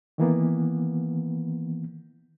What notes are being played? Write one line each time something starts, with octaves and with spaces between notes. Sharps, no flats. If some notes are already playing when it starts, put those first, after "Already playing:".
D#3 E3 A#3 B3